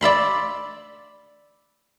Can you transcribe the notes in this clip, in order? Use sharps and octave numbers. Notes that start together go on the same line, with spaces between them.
D5 E5 B5 C6